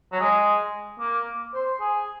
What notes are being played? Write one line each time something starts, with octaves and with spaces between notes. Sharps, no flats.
F#3
G#3
A#3
C5
G#4